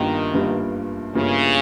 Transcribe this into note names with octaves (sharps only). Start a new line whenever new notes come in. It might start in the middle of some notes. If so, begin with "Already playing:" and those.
Already playing: G1 G2 D#3 G3 A#3 F4
G1 G2 G3 A#3 F4
G1 G2 C#3 G3 A#3 F4